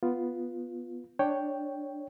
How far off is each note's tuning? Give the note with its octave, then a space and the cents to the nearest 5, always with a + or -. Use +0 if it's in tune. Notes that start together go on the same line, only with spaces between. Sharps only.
B3 +0 F4 +0
D4 +5 C#5 +0 G5 +0